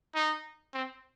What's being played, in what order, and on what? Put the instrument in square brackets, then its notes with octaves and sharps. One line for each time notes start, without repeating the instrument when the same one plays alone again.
[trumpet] D#4
C4